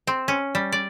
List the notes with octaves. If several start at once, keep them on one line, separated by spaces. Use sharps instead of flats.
C4
C#4
G3
D5